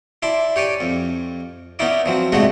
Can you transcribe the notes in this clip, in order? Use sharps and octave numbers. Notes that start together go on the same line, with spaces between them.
E4 D5 A5 C6
G4 C#5 D5 G#5
F2
B3 C#4 D#4 E4 D5
F3 F#3 C4
G#2 C3 G#3 A3 D4 F#4